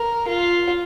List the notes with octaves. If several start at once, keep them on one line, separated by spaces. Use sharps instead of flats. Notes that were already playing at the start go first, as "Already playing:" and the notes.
Already playing: A#4
F4